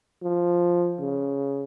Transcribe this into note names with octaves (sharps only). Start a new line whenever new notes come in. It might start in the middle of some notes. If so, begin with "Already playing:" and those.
F3
C#3